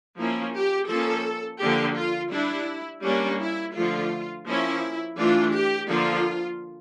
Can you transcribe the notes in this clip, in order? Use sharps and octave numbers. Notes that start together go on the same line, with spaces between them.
F3 A#3 C#4 E4
G4
F3 A#3 C#4 A4
D3 F3 A#3 G4
F4
G3 D4 E4
G3 A#3 C#4 D4
E4
D3 F3 A3 F4
F3 A#3 C#4 E4
E3 A3 D4 F4
G4
D3 F3 A#3 F4